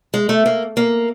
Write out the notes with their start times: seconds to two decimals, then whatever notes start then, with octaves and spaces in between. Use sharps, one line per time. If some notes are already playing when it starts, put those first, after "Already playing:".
0.14 G#3
0.29 A3
0.46 A#3
0.77 A#3